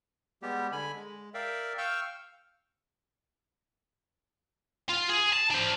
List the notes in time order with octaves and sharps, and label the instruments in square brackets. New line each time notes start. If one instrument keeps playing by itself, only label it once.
[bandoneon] G3 G#3 B3 G4
D3 G#5 B5
G#3
A#4 D5 E5 F5 G5
F5 G5 C#6 E6 F6 G6
[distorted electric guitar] F4
G#4
A5
D4 C5